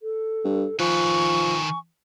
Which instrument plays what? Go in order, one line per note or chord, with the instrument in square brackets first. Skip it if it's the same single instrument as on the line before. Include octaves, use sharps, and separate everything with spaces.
[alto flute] A4
[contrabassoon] G2
[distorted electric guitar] D#3 B4 [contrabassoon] F3 [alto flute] G#5 [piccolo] C#6